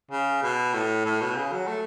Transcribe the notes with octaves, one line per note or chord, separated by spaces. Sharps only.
C#3
B2
A2
A2
B2
C#3
F#3
A3